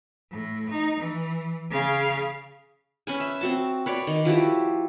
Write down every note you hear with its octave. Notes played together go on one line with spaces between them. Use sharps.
A2
D#4
E3
C#3 F5
C#4 B4 G#5
E5
C4 F#4 A5
B4 C#5 D5
D#3
F3 E4 F#4 G4